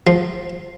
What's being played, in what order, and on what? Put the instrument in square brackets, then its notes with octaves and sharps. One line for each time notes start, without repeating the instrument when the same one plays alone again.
[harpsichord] F3